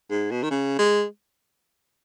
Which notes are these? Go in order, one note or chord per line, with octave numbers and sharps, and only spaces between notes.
G#2
B2
D#3
C#3
G#3